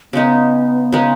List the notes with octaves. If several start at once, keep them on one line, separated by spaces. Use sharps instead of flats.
C#3 G#3 B3 D#4
C#3 G#3 D#4